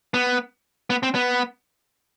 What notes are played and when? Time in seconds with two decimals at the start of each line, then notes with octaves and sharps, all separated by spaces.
0.14 B3
0.90 B3
1.03 C4
1.15 B3